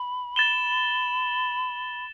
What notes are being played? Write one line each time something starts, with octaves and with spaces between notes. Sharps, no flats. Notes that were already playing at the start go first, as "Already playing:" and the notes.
Already playing: B5
A6 E7 G7